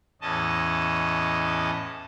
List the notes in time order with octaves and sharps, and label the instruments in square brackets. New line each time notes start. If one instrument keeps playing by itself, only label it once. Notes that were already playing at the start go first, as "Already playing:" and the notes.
[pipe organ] E2 A2 C#4 D#5 A5